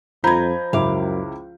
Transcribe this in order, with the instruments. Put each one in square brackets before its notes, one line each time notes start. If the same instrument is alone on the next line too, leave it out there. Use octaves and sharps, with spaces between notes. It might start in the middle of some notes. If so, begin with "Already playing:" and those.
[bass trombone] F2 [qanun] F3 D#5 [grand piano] A#5 B5 [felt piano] G6 G#6
[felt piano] C#2 E4 D6 [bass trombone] F#2 [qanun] F5